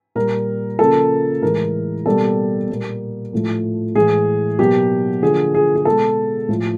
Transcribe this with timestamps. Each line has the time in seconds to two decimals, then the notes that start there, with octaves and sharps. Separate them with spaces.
0.15 A#2 G3 A#3 A#4
0.79 C#3 F3 A#3 A4
1.42 A2 E3 G#3 A#4
2.06 B2 G3 A#3 A4
2.69 A#2 G3 A#3
3.33 A2 F3 A3
3.95 A2 E3 G#3 G#4
4.59 B2 F#3 A#3 G4
5.22 D3 F3 A#3 G#4
5.54 G#4
5.76 G#4
5.85 B2 G#3 A4
6.49 A2 F3 A3